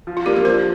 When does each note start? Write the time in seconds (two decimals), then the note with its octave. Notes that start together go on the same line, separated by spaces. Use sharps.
0.07 F3
0.17 F4
0.26 A#3 D4 G4
0.36 A#4
0.45 F3 C5